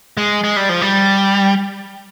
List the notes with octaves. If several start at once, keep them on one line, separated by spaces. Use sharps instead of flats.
G#3
G#3
G3
F3
G3